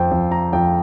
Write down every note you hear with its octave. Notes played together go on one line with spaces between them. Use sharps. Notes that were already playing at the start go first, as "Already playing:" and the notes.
Already playing: F2 C5 G5
F2
A#5
F2 G5